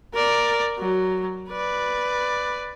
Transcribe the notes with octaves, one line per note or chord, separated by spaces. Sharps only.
A#4 D5
F#3
B4 D5